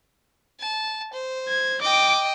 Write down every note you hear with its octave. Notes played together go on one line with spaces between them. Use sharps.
A5
C5
G#6
D#5 G5 D6